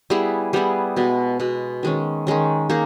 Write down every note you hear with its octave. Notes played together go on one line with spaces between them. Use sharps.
G3 B3 E4 G#4
G3 B3 E4 G#4
B2 G#3 B3
B2 G#3 B3
D#3 G#3 C#4
D#3 G#3 C#4
A#3 D#4 G#4